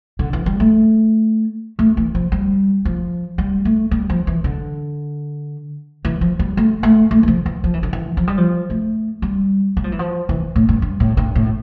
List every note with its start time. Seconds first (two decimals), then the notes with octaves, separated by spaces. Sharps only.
0.19 D3
0.33 E3
0.46 G3
0.60 A3
1.79 A3
1.97 E3
2.15 F3
2.32 G3
2.85 F3
3.38 G3
3.65 A3
3.91 G3
4.10 F3
4.27 E3
4.44 D3
6.05 E3
6.21 F3
6.39 G3
6.57 A3
6.83 A3
7.11 A3
7.23 E3
7.28 F3
7.46 E3
7.64 F3
7.74 E3
7.83 D3
7.93 E3
8.17 F3
8.28 G3
8.38 F3
8.70 A3
9.22 G3
9.77 G3
9.84 F3
9.92 E3
9.99 F3
10.29 E3
10.56 A2
10.69 G2
10.82 G2
11.00 A2
11.17 G2
11.35 A2